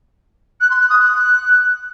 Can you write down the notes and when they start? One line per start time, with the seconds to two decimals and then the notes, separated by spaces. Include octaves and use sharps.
0.60 F#6
0.70 C6
0.80 F#6
0.89 D#6
0.99 F#6